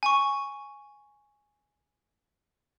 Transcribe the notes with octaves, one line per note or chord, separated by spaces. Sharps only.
G#5 C#6